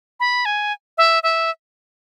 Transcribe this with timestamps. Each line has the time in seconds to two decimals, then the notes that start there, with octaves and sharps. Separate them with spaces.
0.20 B5
0.45 G#5
0.98 E5
1.23 E5